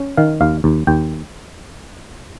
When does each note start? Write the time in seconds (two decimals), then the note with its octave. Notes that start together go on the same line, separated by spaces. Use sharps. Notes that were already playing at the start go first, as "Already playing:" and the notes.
Already playing: C#4
0.17 D#3 F5
0.41 D#2 F5
0.64 D#2
0.87 D#2 G5